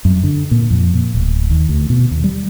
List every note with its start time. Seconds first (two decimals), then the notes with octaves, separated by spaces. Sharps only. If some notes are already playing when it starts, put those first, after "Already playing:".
0.05 F#2
0.23 D3
0.51 A#2
0.70 F2
0.94 A#2
1.15 D1
1.50 D#2
1.69 D2
1.90 B2
2.11 D#2
2.24 G3